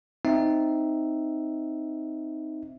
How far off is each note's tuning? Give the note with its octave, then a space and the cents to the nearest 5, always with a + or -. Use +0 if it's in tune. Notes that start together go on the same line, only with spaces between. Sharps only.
C4 -10 D#4 +0 E5 +0